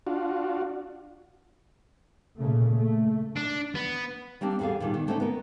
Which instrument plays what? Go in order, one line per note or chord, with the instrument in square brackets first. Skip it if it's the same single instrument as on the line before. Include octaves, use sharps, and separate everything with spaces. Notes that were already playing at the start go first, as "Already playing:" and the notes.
[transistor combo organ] D4 F4 F#4
[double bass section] A#2 C#3 A3
A3
[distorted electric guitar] D4
B3
[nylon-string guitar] G3 A#3 C4 D4
E2 G3 B3 G#4 A4 F5
A#2 D3 D#3 G3 F4
D#3 B3
D3 A3 C4 C#4 D#4
B3 A#4